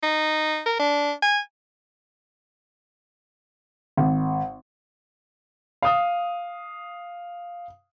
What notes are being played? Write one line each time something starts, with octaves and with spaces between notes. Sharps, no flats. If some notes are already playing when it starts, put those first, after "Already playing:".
D#4
A#4
D4
G#5
G#1
F5 D#6